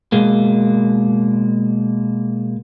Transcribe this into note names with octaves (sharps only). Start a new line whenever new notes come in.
B2 G#3 A#3